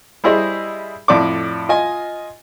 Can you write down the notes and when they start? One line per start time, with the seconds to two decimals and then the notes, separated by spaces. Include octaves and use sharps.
0.24 G3 E4 G#4 C5 D#5
1.08 F2 A2 D5 D6
1.69 F4 D#5 G#5